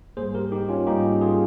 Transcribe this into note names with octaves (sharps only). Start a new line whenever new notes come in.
G#2 G3 A#3 G#4 C5
G4 A#4
D#4 G4
C#4 F4
G#2 G3 A#3 D#4 G4
F4 G#4